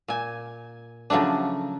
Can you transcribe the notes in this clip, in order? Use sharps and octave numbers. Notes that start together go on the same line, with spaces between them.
A#2 G#5
C#3 F3 F#3 A3 D4